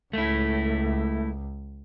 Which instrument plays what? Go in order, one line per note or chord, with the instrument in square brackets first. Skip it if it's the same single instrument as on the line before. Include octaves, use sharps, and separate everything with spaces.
[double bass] C#2 [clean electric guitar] A3 E4